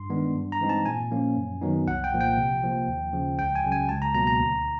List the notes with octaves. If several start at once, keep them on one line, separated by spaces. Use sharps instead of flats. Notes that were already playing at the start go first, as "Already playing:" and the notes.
Already playing: G2 C6
D#3 G#3 B3 D4
G2
A#5
E3 G#3 C4 D#4
A5
A#2 G#5
F3 A#3 C#4
F#2
D#3 F#3 B3 D#4
C2 F#5
G5
A#2 F3 A#3
G5
C3
F3 A#3
D#2
C#3 F3
C#2 G5
G#5
C#3 F#3
G#5
C#2 A5
A#5
B2 F#3 A#3 A#5
A#5
D2